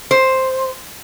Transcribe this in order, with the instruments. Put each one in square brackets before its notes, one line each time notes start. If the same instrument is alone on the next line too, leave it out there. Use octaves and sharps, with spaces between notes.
[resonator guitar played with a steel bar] C5